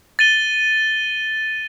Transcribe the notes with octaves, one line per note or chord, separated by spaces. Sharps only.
A6 D#7 G7